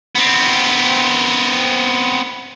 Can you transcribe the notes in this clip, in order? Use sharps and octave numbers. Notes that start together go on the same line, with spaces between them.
B3 C4